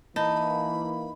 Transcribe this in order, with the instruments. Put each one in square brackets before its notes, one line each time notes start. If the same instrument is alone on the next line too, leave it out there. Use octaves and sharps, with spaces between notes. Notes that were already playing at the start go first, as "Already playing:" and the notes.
[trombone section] E3 A#3 [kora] D#4 [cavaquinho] A5 [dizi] B5